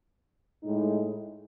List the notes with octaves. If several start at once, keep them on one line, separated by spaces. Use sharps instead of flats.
A2 G#3 D#4